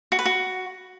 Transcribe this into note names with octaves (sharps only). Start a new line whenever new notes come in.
F#4
B4
F#4